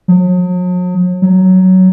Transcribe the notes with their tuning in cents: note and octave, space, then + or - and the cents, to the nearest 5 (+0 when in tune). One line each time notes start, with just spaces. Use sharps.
F#3 -45
F#3 +10